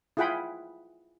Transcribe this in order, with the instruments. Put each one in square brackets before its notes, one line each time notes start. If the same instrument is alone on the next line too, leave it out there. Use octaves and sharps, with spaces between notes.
[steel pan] E4 F4 G#4 F#5 G5 B5